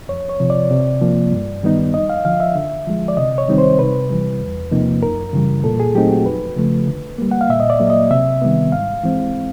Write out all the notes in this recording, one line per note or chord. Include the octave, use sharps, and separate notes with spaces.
F2 C#5
C#5
C3 F3
D5
C3
F3 A#3
G2
D#3 G3 B3 D#4
F2 D#5
F5
D3 F3 F5
E5
D3
F3 G#3
D5
C3 D#5
C#5
D#3 G3 C4 D#4
C5
C3 B4
E3 G3
E2
C3 F3 A#3 D#4
F#2 A#4
C#3 E3 G3
A#2 A4
G#4
F#3 A3 C4 D#4 G4
F#4
F2 B4
C#3 F3 A3
D3
G3 A#3
F#5
F5
A#2 E5
D#5
D5
F#3 A#3
D#5
C3 E5
D#3 G3 B3
G#2 F5
E3 G#3 C4